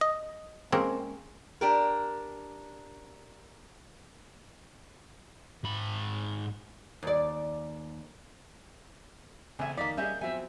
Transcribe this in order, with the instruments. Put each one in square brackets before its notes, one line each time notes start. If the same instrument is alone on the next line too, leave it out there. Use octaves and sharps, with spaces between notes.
[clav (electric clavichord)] D#5
[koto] G#3 A#3 C#4 [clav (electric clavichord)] C4
[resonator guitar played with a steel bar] D4 G4 A#4
[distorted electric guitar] G#2 B5
[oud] D#2 D5
[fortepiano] A1 E5 [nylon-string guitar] C#3 C4 [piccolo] G#5
[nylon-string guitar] F2 D#3 [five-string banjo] A#3 D5 [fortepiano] D#4 [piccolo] B6
[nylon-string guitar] G3 C#4 G#5 [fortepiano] G#4 D#5 E5 [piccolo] G6
[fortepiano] F2 F#3 C4 [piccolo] E5 [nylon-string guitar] G#5